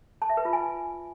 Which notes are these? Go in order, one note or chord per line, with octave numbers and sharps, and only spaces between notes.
A5
E5
B4
F4
G#5